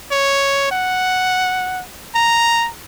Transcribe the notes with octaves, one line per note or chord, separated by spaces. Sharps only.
C#5
F#5
A#5